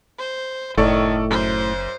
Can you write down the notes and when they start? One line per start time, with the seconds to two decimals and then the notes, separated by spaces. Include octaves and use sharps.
0.19 C5
0.78 F#1 A2 D#3 A4 D5 C#6
1.31 F#2 C5